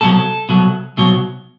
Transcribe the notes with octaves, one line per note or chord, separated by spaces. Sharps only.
C2 B2 F#3 A4
C2 B2 F#3
C2 B2 F#3